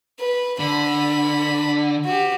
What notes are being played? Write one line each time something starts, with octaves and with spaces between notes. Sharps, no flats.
B4
D3 B5
F#4 G4